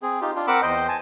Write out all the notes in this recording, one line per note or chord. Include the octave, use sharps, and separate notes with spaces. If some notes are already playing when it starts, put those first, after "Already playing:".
C4 G#4
D#4 F4 G4
D4 F4
C4 A#4 F#5 B5 D6 E6
E2 C5 D#5 G5
G#5 A5